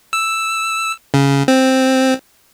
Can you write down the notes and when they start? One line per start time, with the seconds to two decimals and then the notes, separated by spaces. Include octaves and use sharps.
0.13 E6
1.14 C#3
1.48 C4